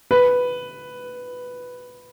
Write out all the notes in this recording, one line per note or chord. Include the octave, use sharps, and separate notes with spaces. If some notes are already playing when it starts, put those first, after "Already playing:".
B4